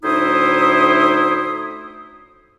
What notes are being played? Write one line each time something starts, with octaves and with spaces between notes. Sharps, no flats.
D2 A2 D#4 E4 C5 D#6